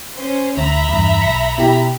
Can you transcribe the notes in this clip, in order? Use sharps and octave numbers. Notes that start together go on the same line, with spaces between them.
C#4 C5
D2 E5 A#5 B5
E2 G2
B1 C#7
B2 E4 G4